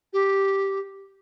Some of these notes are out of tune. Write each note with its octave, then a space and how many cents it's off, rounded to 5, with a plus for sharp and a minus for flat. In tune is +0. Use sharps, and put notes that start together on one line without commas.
G4 -5